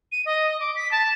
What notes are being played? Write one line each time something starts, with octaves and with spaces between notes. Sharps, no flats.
D#7
D#5
D6
B6
A5